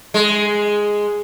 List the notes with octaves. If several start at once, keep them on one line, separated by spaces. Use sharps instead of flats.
G#3